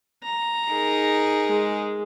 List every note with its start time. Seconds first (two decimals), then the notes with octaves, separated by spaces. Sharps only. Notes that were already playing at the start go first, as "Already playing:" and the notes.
0.24 A#5
0.69 D#4 G#4 A#4
1.47 G#3